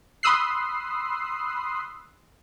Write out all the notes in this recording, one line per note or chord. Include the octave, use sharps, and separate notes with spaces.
B5 C6 D#6 E6 F#6 C7